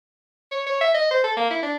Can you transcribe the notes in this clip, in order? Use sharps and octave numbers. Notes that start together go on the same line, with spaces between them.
C#5
C#5
E5
D#5
C5
A4
A#3
E4
D4